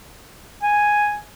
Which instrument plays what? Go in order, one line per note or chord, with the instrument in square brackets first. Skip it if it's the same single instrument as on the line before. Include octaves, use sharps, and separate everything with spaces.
[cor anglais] G#5